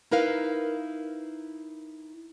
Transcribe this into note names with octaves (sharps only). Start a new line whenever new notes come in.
D#4 E4 A#4 B4 F5